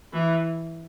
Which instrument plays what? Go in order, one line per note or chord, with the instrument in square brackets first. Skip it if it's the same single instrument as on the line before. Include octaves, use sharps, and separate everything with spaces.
[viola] E3